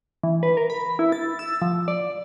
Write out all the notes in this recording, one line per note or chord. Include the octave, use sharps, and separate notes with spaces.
E3
B4
A#4
B5
E4
A6
E6
F3
D5